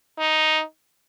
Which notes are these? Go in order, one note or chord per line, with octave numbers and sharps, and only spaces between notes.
D#4